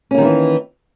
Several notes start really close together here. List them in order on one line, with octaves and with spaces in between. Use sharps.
C#4 A#3 D#3 G#3 E3